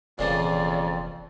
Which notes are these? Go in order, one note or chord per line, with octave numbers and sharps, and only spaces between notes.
F1 F2 A#2 C#3 E3 D5